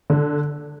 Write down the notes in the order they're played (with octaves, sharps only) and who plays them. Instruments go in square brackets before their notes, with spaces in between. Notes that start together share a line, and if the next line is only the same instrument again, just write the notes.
[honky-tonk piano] D3